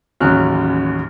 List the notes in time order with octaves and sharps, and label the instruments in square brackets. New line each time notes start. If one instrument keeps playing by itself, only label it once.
[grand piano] A1 D#2 C#3 F#3 F6 F#6